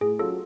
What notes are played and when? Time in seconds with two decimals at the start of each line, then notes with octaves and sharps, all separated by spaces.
0.01 A2 G#4
0.19 F#3 C#4 F4 A4